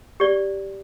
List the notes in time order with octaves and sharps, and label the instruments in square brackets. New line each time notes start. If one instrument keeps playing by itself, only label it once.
[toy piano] G4 D5